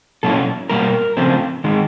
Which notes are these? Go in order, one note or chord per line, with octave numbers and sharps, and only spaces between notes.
B2 F#3 A#3 C#4 E4 A4
B2 G3 A#3 A#4
C#3 F3 A3 C4
D#3 G#3